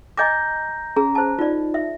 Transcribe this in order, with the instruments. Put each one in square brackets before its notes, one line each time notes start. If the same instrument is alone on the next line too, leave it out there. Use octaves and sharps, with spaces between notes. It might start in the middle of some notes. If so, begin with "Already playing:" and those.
[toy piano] D#5 G#5 D6 [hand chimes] A#5 G6 A#6
[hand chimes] C#4 A#5 [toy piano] G#4
[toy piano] C5 A5
[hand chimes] D#4 [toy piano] F4 D5
[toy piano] E5